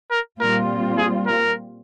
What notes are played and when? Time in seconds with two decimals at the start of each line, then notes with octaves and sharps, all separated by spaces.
0.11 A#4
0.40 A#2 G3 C4 F4 A#4
0.97 G#4
1.27 A#4